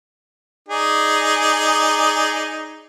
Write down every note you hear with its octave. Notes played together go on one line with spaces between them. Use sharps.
D#4 G#4 D5